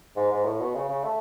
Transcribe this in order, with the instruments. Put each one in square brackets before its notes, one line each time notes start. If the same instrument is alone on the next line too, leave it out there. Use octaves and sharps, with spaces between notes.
[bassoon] G#2
G#2
A2
B2
C#3
C#3
A3